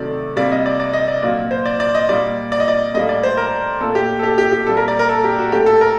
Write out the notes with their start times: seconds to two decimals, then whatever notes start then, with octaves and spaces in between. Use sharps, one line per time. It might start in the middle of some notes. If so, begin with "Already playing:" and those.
Already playing: C3 D#3 F#3 A3 D5
0.36 C3 G3 A#3 D5
0.52 D#5
0.66 D5
0.80 D5
0.93 D#5
1.08 D5
1.22 A#2 F#3 A#3 D5
1.51 C5
1.66 D5
1.80 D5
1.95 D#5
2.09 A#2 G3 A#3 D5
2.52 D5
2.60 D#5
2.68 D5
2.94 A2 G3 A#3 D#5
3.09 D5
3.23 C5
3.37 A#4
3.81 A#2 A3 A4
3.95 G4
4.19 A4
4.23 G4
4.38 G4
4.52 G4
4.67 A#2 G3 A#3 A4
4.77 A#4
4.88 D5
4.99 A#4
5.09 A4
5.24 G4
5.39 F#4
5.52 A2 A3 G4
5.66 A4
5.81 A#4